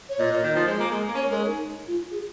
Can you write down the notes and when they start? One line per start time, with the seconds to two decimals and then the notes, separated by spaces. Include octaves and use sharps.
0.09 C#5
0.19 A#2 D#5
0.31 A#2
0.43 D#3
0.55 F3
0.67 G#3
0.79 A#3
0.91 G#3
1.08 A#3
1.15 C#4 C#5
1.31 G#3 A#4
1.47 D#4
1.87 F4
2.11 G#4